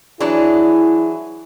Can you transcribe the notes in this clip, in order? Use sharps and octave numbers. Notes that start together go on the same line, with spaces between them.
E3 F#3 D4 E4 G#4